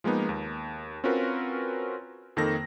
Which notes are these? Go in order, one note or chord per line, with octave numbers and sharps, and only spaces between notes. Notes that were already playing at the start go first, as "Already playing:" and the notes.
F3 G#3 A#3 B3 D#4
D#2
C4 C#4 F4 F#4 A#4 B4
F2 D#3 A#3 A4 A#6